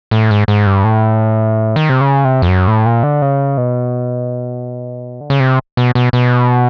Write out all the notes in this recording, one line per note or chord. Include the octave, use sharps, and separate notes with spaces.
A2
G#2
G#2
G2
A2
D#3
C3
C#3
C3
F2
F#2
A2
A#2
D3
C#3
B2
D3
C#3
C3
B2
B2
B2